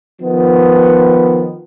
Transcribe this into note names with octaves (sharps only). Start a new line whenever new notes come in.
D#3 F3 B3